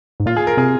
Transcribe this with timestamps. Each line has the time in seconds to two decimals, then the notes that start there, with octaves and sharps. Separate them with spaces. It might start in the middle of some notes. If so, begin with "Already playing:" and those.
0.20 G#2
0.26 A#2 F4
0.37 G#4
0.47 A#4
0.57 C3 G#4